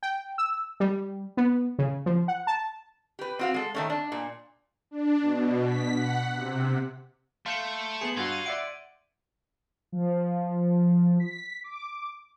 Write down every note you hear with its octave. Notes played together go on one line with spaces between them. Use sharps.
G5
E6
G3
B3
C#3
F3
F#5
A5
G4 B4
C4 F#4 F5
G#3 A4
D#3 A3 C#4
D4
A#2
D4
B2
B6
F#5
C3
A3 F5 C6 G6 C#7
B3 G#4 C#7 F#7
G2 F4 F#4 G#6
D#7
D5 E5 F#5 D7
F3
B6
D6